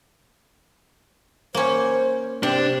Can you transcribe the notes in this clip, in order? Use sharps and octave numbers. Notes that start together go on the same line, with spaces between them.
A#3 C#4 C5
C3 C4 D4